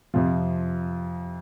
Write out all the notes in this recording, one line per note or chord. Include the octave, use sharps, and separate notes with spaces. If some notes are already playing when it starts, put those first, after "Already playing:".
F2 C3 F3 F4